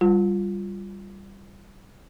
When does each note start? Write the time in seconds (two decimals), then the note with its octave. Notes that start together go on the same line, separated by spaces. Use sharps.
0.01 G3 F4